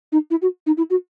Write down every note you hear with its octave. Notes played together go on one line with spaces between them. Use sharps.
D#4
E4
F#4
D#4
E4
F#4